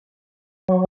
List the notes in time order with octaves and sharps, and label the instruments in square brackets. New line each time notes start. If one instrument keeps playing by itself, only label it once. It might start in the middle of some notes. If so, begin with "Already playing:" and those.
[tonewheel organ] F#3